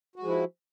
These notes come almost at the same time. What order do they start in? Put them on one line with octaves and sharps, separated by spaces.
F#4 G#3 F3 E4